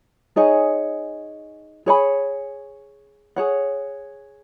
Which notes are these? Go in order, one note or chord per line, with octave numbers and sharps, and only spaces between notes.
D#4 G#4 C#5 G#5
G#4 C#5 G#5 B5
G#4 C#5 F#5